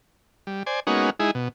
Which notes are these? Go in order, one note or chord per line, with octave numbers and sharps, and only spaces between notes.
G3
C5 D5 G#5
G#3 A#3 B3 C#4 D#4 F#4
G#3 D#4 E4 G#4
B2